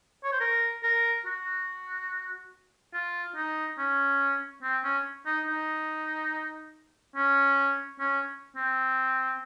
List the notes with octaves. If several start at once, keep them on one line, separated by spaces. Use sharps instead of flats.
C#5
C5
A#4
A#4
F#4
F4
D#4
C#4
C4
C#4
D#4
D#4
C#4
C#4
C4